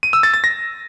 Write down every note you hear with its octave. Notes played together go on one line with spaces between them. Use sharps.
D#7
E6
A6
A6
A#6